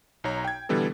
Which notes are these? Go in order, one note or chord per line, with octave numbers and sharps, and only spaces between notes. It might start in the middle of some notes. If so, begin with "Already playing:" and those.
B1 D#4 C#5 A#5
G5 G#6
B2 D3 E3 G3 B3 A4